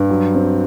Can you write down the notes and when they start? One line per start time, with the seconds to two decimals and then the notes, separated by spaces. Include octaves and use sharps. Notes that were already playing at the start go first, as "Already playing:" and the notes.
Already playing: G2
0.10 F#3
0.35 C4